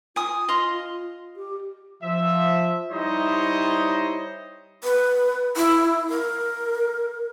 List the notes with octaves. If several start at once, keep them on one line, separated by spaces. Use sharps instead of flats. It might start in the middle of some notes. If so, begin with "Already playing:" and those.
F4 G#5 D#6
D#5 F5 C6
G4
F3 E5
G3 D#4 E4 C5 C#5 D#5
B4
E4
A#4